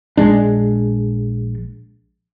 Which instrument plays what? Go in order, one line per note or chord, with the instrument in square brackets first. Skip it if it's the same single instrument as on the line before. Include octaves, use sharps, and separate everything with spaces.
[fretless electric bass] A#1 G#3 D4